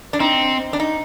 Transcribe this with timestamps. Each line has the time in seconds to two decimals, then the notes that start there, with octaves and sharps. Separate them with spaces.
0.13 D4
0.20 C4 D#4
0.73 D4
0.80 D#4